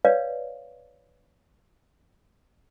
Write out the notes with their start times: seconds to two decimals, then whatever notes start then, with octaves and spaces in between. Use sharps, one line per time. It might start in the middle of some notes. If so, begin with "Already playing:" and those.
0.05 B4 C#5 D5 F5